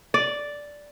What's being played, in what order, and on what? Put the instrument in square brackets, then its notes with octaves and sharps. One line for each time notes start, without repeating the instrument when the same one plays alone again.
[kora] D5